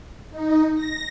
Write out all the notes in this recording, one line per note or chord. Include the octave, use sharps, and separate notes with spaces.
D#4
A#6